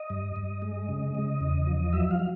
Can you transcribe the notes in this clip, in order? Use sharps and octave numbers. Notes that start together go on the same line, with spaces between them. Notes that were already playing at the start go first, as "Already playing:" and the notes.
Already playing: D#5
G2
G2
G#3
C#3
C#3
E2
F3
F#3 E5
F5
F#3